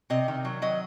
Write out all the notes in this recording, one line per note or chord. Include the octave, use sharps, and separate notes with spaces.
C3 D#5
D#3
F#3
F#3 D#5